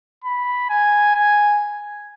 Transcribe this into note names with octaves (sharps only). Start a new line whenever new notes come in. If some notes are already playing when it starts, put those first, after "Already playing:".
B5
G#5
G#5